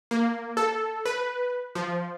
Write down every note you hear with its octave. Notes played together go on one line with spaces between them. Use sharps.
A#3
A4
B4
F3